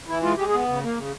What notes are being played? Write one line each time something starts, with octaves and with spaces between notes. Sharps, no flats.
E3 E4
G#3 F4
G#3 G4
G#4
B3
C#3
A#3
C#3